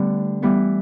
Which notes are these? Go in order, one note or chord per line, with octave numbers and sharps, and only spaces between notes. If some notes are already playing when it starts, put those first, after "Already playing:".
Already playing: D3 G3 A3 B3
E3 G3 B3 E4